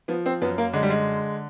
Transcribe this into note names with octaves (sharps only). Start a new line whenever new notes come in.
F3 B3
C4
F#2 B3
A#3
D3 G#3
G3
G#3